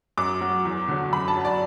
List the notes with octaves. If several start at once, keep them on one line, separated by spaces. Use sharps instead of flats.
F#2 D6
F#3
E2
D3 F#3
F#2 B5
A5
F#3
D5